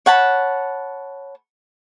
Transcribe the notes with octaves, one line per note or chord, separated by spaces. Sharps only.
C#5 F#5 A5 B5